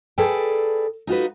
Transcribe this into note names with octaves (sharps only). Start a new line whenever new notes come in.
G#4 A4 B4 D5 G5
D#4 F4 F#4 B4